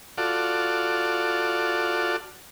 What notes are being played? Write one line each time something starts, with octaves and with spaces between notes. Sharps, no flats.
F4 F#4 A4 D5